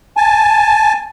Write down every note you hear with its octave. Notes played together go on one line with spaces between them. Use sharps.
G#5 A5